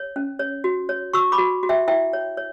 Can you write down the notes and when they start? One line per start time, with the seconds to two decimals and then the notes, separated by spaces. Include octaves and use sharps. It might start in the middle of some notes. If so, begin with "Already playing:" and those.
Already playing: C#5
0.16 C#4
0.39 C#5
0.64 F#4
0.89 C#5
1.13 F#4 C#6 E6
1.32 B5 D6
1.38 F#4
1.63 F#4
1.69 E5 G5
1.88 E4 E5 G5
2.13 C#5
2.37 C#5